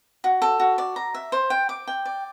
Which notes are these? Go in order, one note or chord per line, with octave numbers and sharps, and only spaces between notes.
F#4
A4
F#4
D5
A#5
E5
C5
G5
D6
G5
D5